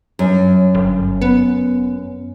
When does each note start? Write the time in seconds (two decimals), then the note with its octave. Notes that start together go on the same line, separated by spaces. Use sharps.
0.19 F#2
0.75 G1
1.22 B3